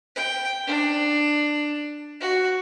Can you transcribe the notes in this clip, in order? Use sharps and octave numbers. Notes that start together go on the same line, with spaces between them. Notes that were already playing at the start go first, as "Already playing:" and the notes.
G5
D4
F#4